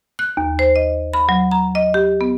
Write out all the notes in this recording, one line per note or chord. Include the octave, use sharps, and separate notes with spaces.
F#6
D#2
C5
D#5
B5
F#3
A#5
D#5
G4
B3